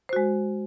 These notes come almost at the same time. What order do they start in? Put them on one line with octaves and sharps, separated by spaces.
C5 F#4 G#3